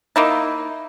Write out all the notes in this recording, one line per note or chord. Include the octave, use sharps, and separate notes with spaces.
A#3 D#4 E4